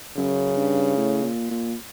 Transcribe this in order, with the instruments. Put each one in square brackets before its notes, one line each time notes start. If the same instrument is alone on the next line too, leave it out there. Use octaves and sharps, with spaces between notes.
[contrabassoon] F#2 [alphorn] C#3
[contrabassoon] G2
A2
A#2
A#2